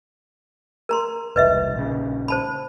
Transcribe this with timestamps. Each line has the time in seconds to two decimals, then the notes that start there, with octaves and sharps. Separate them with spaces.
0.89 A#4 A#5 C6
1.36 E1 C2 B4 D#5 E5
1.75 A#1 C#3
2.28 C5 A5 B5